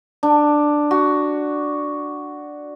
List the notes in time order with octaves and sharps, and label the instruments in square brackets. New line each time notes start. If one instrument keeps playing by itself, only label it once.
[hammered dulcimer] D4
F#4